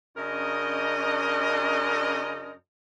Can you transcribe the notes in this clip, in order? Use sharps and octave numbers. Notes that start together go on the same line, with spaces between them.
F#2 C#3 D4 A#4 D#5